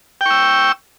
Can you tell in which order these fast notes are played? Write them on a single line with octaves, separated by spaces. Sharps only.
G5 C#6 E6